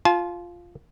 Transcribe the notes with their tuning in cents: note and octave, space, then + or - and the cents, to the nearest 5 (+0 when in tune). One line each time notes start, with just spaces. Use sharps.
F4 +0 A5 -40